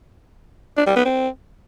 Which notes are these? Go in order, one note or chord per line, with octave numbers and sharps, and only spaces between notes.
D4
G3
B3
C4